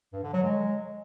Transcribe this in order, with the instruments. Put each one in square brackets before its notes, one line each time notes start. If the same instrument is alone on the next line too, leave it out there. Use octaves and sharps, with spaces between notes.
[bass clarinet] G2
D3
F#3
G#3